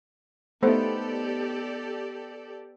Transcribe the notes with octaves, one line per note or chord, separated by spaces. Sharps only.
A3 B3 D#4 G4 A4 C5 D5